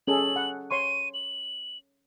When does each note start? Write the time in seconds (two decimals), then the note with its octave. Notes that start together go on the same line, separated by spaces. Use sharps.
0.07 C#4 G#4 A4 F#7
0.36 F#5
0.71 C#5 C6 C#6 D#7
1.14 F#7